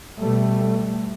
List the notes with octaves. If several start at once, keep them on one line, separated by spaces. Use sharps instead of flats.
B2 G3 A3